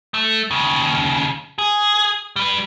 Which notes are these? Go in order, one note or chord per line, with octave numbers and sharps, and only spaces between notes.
A3
D#2 C#3
G#4
G3 B4